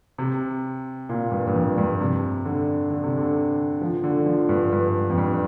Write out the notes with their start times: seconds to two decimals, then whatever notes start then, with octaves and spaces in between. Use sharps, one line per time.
0.18 C3
1.09 A#2
1.32 G2
1.47 G2
1.55 F2
1.78 G2
2.00 C3
2.45 D3
2.90 D3
3.03 C3
3.18 D3
3.82 F3
4.04 D3
4.26 F3
4.49 G2
4.72 G2
5.10 F2
5.18 G2